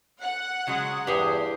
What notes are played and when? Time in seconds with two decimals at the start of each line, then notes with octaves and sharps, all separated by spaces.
0.22 F#5
0.67 C#3 F#3 G#3
1.07 E2 G2 G4 G#4 C5